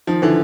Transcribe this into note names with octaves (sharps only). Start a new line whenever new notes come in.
D#3 F3
D3 E3